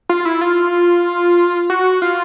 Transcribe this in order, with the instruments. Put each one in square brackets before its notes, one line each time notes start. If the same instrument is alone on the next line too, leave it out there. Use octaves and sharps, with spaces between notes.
[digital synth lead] F4
E4
F4
F#4
F4